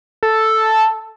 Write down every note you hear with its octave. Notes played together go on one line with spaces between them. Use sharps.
A4